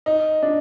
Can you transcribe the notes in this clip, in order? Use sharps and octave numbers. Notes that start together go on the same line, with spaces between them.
D#4
D4